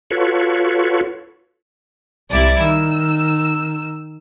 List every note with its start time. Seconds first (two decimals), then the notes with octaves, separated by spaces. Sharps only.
0.11 F4 F#4 A4 B4 C#5
2.31 C2 G3 E4 D5
2.62 D#3 E6